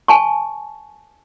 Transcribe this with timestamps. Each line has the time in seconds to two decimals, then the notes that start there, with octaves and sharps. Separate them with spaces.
0.08 G#5 A5 C#6